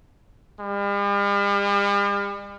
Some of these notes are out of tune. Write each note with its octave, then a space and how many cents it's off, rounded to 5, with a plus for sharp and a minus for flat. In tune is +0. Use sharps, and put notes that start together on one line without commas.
G3 +45